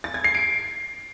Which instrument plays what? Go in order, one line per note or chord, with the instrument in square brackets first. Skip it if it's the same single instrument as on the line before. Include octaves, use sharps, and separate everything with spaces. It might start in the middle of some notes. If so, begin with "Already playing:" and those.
[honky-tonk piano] A6
G#6
C7
D7